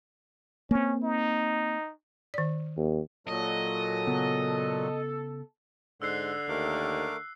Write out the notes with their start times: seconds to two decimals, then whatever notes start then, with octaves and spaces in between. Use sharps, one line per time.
0.71 A#3 C4 C#4
1.04 D#4
2.34 D#3 D5
2.76 D#2
3.27 A#2 F#3 A4 D#5
4.07 C#3 B3
6.02 G#2 D3 C6 E6 F#6 C7
6.49 D#2 A3 A#4 D6